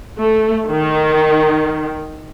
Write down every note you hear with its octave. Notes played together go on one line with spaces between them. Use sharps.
A3
D#3